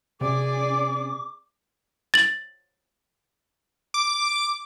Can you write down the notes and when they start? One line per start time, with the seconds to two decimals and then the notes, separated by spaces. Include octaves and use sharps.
0.21 C3 C#4 G#4 D5 D6
2.14 A6 F#7
3.94 D6